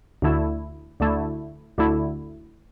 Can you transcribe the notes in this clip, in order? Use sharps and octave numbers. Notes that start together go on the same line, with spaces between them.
D2 D3 A3 E4
D2 D3 A3 E4
D2 D3 A3 E4